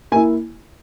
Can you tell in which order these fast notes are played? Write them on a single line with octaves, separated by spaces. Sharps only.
A#3 G#5 E4